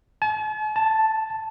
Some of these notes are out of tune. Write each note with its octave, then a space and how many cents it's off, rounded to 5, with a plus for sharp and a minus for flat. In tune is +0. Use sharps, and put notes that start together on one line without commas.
A5 -45
A5 +0